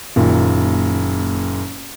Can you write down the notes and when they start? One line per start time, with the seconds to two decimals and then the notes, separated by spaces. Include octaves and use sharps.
0.16 F#1 A#2 D#3